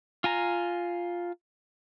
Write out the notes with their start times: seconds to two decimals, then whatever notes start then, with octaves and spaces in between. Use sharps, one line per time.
0.24 F4 G#5 A#5